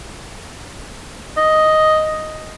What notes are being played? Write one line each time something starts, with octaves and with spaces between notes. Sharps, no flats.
D#5